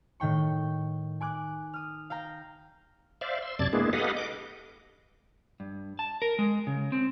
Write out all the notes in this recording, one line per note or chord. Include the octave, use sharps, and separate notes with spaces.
A2 D#3 G5 C#6
G#5 D6 F#6
D#6 F6
F5 G5 A#5
C5 D5 E5 F5
C6 E6
F#2 C3 D5 A5 G#6 A6
G#3 A#3 B3 D4 E4 G#4
G4 A4 B4 D#5 F5 F#5
D#5 D6
G2
A5
A#4
G#3
C#3
C4